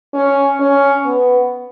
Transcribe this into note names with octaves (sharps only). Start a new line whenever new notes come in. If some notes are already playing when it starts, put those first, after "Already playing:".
C#4
C#4
B3